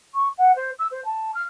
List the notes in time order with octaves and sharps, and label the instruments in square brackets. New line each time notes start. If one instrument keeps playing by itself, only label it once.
[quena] C#6
F#5
C5
E6
C5
A5
F6